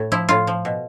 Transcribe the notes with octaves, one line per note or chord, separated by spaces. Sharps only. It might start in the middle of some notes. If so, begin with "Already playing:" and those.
Already playing: A2
F3 E4
A2 F4
F3
B2